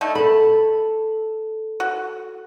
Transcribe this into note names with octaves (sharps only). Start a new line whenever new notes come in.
D3 A3 D#4
A4 A5 B5
F#4